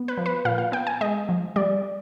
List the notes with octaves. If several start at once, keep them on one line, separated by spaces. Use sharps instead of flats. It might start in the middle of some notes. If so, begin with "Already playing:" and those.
Already playing: B3
B4
F3
B4
A#2 F5
F5
B3 G5
G#5
G#3 D#5
F3
G3 D5